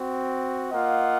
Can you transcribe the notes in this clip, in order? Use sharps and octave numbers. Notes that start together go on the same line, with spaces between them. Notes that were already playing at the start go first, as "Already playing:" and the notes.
Already playing: C4 F#4
A#3 F4 D#5 F#5